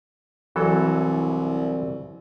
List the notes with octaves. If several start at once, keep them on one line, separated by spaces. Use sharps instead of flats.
C2 E3 F#3 A4